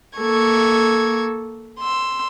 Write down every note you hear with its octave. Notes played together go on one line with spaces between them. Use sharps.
A#3 A4 C#6 G#6
C6 E6